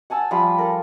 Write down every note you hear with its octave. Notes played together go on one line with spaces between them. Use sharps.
F#5 G#5 A5 E6
F3 G3 F5 B5
A4 A#4